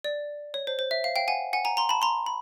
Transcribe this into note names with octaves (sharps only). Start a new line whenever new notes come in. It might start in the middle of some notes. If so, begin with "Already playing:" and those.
D5
C#5
C5
C5
E5
F5
F5 G5
F#5 G#5
F#5 G#5
G#5 A#5
A#5 C6
A5 B5
A#5 C6
B5